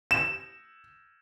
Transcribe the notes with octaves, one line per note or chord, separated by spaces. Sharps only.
E7